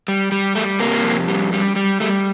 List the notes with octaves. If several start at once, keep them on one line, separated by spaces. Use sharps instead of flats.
G3
G3
G3 A3
C3 A#3
F2
G3
G3
G3
G3 A3